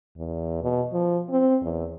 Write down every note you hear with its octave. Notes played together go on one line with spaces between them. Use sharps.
E2
B2
F3
C4
E2